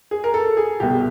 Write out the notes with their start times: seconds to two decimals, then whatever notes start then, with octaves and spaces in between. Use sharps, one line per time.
0.11 G#4
0.24 A#4
0.34 A4
0.57 G#4
0.80 C2 B2 G4